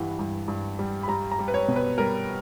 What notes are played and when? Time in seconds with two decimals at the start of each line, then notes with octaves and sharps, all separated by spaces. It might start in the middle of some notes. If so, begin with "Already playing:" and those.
Already playing: G2 E3 G3 F#5
0.19 G2
0.48 G2
0.79 G3
1.03 B5
1.08 G3 A#5
1.31 A#5
1.39 G3
1.48 B4
1.54 C#5
1.68 B2
1.76 B4
1.98 G3 A#4